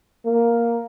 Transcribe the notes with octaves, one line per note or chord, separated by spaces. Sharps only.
A#3